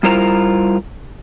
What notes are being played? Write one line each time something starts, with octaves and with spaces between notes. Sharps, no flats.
G3 E4 F4 A#4 C5 A#5